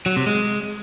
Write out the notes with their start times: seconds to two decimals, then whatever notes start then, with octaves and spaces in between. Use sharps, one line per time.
0.06 F#3
0.16 C3
0.27 G#3